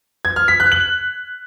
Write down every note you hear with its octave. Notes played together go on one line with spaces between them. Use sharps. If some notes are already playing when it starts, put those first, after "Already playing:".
G#6
F6
B6
F#6
F#7